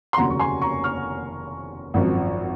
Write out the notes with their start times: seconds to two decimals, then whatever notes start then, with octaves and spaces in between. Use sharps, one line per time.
0.13 C6
0.17 F1 D#2 C#3 F#3 F#5 A#5
0.30 C#6
0.40 G#5 C6
0.62 A#5 C#6
0.84 C#6 F6
1.94 G#1 F#2 F3